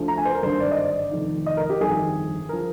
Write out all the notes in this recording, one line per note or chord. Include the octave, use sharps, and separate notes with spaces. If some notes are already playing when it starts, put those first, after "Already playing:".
Already playing: D2 D3 F3
A#5
G#5
C5
A#4
G#1 G2 D3 C5
D5
D#5
D5
F1 F2 D#3
D#5
A#4
G4
G1 F2 D#3 G#4
F3 A#4